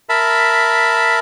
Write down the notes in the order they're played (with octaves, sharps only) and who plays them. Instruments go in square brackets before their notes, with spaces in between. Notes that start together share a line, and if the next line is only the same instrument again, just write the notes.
[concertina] A#4 E5 A5 B5